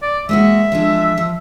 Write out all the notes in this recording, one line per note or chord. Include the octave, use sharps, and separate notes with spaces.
D5
G#3 A#3 F#4 E5
F3 G#3 D4
F3